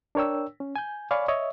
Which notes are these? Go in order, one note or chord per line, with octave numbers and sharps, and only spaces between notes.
D4 A#4 C#5 G5 E6
C#4
G#5 G6
C#5 D5 F5 G#5 B5 C#6
C#5 D#5 E5